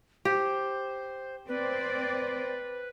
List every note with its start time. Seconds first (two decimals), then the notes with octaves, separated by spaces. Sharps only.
0.25 G4 C5
1.48 C4 B4 C5 D5